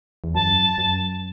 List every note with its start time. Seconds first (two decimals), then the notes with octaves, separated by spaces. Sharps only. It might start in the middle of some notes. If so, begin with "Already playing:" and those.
0.24 E2
0.34 F#2 A5
0.78 F#2